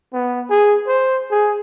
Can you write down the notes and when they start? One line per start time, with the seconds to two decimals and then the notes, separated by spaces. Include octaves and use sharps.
0.13 B3
0.50 G#4
0.88 C5
1.31 G#4